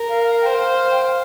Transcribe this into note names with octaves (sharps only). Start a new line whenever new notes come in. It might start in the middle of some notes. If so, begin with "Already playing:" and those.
Already playing: A#4
F5
F5
C5 G5
F5
G5
F5